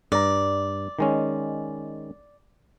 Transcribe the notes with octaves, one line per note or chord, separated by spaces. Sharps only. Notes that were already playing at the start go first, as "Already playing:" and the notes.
G2 D5 A#5
D#3 G#3 C#4